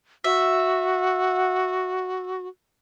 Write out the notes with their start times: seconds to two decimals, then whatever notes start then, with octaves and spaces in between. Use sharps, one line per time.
0.24 F#4 E5